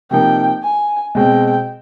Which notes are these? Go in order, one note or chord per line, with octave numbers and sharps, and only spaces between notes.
C3 F3 A#3 D#4 G5
G#5
B2 G#3 C4 G5